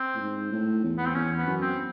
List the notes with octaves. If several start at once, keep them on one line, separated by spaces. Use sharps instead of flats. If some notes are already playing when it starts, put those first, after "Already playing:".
Already playing: C4
A2
G#2
A2
E2
B3
C4
E2 C#4
B3
F#2
C4